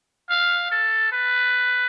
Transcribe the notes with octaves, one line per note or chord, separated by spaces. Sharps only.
F5
A4
B4